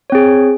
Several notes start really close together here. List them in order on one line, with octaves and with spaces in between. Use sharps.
C#5 C4 G#4